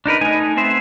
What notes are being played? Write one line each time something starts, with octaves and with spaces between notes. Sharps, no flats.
D4 D#4 A#4 B4
A3 D#4 D#5 G#5
B3 C4 C5 E5